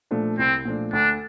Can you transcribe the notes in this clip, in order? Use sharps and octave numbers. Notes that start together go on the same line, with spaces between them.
A#2 F3 A3 D4
C2 C4
A#2 F3 A3 D4
D2 D4